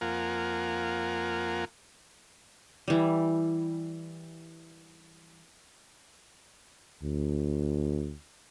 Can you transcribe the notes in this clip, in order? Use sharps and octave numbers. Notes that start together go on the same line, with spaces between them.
F2 A#3 F4 A#4 F#5 G#5
E3 G3
D2